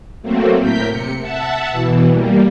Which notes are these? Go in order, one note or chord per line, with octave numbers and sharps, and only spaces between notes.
F#3 A3 A#3 C4
A2 A#4 G6 B6
C3 C#7
E5 F#5 A5
B2 E3
G3 A#3